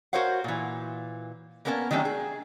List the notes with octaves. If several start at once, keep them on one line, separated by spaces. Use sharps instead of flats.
F#4 A#4 C5 C#5 F5 F#5
A#2 E3
A#3 B3 C#4 A#4 D5 A5
D#3 F#3 A3 C#4 D4 G4
G#4